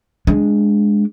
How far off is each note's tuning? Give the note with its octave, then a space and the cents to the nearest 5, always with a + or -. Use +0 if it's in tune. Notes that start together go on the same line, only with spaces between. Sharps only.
G#3 +0 D4 -5